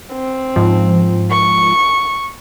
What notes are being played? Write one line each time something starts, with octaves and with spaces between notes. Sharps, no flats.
C4
G#2 F3
C#6